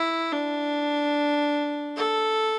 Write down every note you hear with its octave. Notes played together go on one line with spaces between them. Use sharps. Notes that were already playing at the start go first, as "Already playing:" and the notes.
Already playing: E4
D4
A4